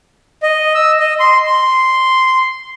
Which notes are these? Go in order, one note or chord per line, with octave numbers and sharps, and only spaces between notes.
D#5
E6
D#5
C6
C6